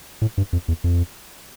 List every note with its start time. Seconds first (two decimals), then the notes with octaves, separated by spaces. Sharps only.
0.22 A2
0.38 G2
0.53 F2
0.68 E2
0.84 F2